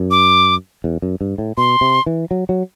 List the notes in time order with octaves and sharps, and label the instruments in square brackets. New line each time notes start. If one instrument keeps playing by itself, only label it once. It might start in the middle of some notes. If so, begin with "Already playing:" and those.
Already playing: [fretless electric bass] F#2
[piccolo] D6
[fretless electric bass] E2
F#2
G2
A2
[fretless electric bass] B2 [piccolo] C6
[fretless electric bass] C3
E3
F#3
F#3